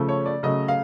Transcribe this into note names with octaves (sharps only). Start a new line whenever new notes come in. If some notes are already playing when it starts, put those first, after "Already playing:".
Already playing: C#3 F3 A3
C#5
D5
C#3 F#3 A3 D#5
F5